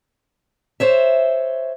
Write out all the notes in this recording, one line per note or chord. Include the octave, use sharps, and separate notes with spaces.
C5 C#5 E5